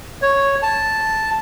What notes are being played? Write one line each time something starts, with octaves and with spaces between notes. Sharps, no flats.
C#5
A5